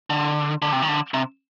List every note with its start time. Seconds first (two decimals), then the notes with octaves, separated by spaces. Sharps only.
0.10 D3
0.62 D3
0.72 C3
0.82 D#3
0.88 D3
1.14 C3